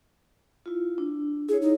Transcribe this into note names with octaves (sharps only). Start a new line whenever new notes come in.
E4 F4
D4
E4 G#4 C#5
D#4